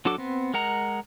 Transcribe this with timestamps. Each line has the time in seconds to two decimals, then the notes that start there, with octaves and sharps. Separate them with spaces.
0.05 F#3 D4 F#4 A4 D6
0.18 B3 C4
0.54 G#3 A#4 F#5 A#5